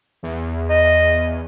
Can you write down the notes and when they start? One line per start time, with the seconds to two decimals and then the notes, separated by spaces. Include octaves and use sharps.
0.23 E2
0.70 D#5